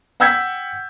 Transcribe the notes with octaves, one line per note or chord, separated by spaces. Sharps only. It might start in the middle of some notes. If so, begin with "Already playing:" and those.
F#5 G5 E6 G6 G#6 B6